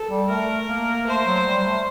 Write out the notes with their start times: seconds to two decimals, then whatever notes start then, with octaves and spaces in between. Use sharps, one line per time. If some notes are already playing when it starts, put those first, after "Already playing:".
Already playing: A4
0.09 G3
0.29 A3 A#4
0.68 A#3
1.07 A3 C5
1.26 F#3
1.46 G3
1.64 A3